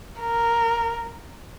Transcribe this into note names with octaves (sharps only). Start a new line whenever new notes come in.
A#4